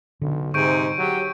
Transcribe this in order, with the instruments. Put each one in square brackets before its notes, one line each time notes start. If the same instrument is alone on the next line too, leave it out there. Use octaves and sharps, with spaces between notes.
[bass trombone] B1 [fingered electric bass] D3
[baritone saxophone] G#2 [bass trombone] C3 [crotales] C#6 G6 D7
[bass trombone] F#3 [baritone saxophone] G4